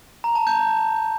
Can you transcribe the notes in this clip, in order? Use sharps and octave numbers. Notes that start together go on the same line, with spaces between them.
A#5
A5
G6